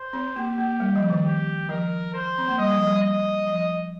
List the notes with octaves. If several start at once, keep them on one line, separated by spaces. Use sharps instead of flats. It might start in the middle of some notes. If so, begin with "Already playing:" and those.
Already playing: C5
C4
A#3 G4
A#3
G3
F3
D#3
G4
F3 A#4
C5
C4
A#3
G3 D#5
F3
G3
D#5
F3